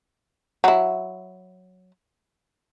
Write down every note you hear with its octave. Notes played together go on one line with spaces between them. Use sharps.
F#3 E4